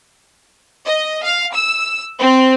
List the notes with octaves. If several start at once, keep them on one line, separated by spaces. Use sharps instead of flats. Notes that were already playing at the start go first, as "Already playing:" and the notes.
D#5
F5
E6
C4